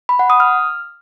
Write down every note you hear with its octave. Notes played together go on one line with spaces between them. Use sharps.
B5
F#5
D#6
F6